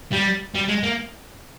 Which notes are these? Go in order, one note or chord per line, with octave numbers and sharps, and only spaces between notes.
G3
G3
G#3
A#3